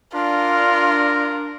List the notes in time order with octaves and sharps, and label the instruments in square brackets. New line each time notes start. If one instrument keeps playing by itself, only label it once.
[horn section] D4 [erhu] F4 [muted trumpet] A#4